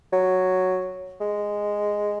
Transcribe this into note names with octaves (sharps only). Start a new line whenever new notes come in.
F#3
G#3